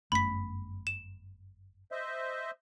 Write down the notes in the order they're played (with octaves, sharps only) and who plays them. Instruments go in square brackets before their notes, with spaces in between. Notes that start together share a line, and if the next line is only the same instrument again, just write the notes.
[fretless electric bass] G1 F#2 A3 [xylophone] B5 B6
[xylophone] E7
[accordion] C5 D#5 E5